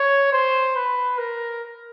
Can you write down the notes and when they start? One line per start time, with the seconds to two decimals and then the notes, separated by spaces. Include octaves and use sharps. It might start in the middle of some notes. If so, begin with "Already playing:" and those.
Already playing: C#5
0.32 C5
0.76 B4
1.18 A#4